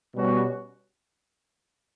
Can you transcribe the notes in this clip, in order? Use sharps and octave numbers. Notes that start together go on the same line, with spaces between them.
B2 G3 C#4 F#4